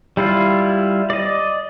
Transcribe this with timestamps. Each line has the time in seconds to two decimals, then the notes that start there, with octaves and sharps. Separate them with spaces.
0.17 G3 E4 F4
1.10 D5 D#5